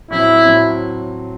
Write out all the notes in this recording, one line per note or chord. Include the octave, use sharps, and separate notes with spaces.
A2 F#3 C4 E4
A2 F#3 C4